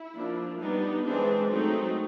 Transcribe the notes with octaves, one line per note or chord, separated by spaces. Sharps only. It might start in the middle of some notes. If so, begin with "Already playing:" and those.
Already playing: E4
F3 A#3 D4
G3 B3 D4 D#4
E3 G#3 C4 D4
F#3 A3 C4 D#4